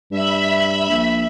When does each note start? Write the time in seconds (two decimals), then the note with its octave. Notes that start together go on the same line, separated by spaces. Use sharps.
0.11 G2 E5 B5
0.89 A#1